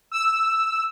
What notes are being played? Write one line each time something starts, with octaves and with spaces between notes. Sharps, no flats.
E6